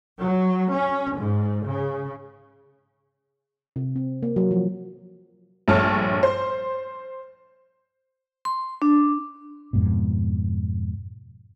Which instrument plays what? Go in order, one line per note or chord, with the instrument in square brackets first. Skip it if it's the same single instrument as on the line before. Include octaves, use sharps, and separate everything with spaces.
[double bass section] F#3
C#4
G#2
C#3
[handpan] C3
C4
A#3
F#3
F3
[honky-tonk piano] A#1 G2 A3 C#5 A5 F6
C5
[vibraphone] C6
D4
[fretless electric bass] F2 G#2 B2